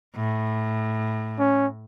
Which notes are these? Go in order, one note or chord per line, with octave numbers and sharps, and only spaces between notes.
A2
C#4